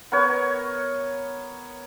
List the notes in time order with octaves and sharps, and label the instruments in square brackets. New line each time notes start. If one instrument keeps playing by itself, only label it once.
[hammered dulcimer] B3 A#4 C#5